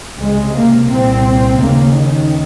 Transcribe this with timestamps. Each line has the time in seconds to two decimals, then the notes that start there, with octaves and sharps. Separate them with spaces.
0.18 C#2 C3 G#3
0.54 A#3
0.89 C2 A#2 C4
1.60 D#2 C#3 A#3
1.95 D#3